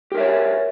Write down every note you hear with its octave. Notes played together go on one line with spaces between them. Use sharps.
G4 A#4 C#5 E5